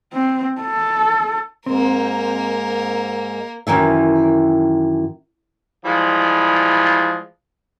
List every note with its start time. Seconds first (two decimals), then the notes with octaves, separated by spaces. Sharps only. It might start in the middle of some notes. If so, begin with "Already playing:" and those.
0.13 C4
0.62 A4
1.66 G#2 A#3 C4 A#4
3.67 F#2 D#3 E3 E5
5.85 E3 F3 G3 G#3